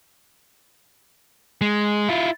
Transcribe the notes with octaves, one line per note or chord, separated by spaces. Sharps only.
G#3
E4 F4